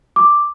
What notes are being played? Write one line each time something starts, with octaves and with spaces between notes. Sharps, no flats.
D6